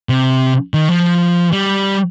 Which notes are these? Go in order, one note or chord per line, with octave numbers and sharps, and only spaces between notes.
C3
D#3
F3
G3